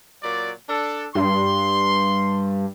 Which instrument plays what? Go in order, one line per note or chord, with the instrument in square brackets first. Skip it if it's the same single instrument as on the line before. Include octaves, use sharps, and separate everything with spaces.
[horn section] A#2 F#3 D5
D4 A4
[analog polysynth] G2 [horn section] C6